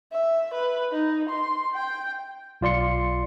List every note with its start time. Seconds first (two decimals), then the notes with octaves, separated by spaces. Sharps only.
0.12 E5
0.54 B4
0.92 D#4
1.29 C6
1.74 G5
2.61 B1 F4 D5 C6 C#7